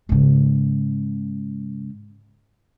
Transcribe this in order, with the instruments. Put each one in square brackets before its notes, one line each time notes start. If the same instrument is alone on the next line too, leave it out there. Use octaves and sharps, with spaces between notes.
[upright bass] G#2 C#3